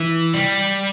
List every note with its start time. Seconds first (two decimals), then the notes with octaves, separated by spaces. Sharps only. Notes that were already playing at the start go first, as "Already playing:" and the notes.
Already playing: E3
0.34 G3